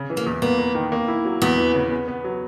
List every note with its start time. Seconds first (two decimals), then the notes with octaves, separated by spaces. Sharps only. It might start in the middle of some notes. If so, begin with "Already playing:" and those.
Already playing: C#3
0.10 E3
0.17 A#3
0.26 E2
0.42 A#3 B3
0.59 A#3
0.75 D#3
0.92 A#3
1.08 E4
1.25 F#3
1.42 E2 B3
1.58 E3
1.75 C#3
1.91 B3
2.08 B3
2.24 F#3